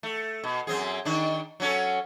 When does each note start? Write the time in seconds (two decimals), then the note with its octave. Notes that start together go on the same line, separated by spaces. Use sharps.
0.03 A3
0.44 B2
0.67 F#2 C4 G#4
1.05 D#3 D4
1.60 F#3 C#4 A4